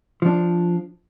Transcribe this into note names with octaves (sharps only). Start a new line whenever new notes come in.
F3 D4